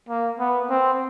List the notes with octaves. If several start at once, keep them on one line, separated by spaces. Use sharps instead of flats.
A#3
B3
C4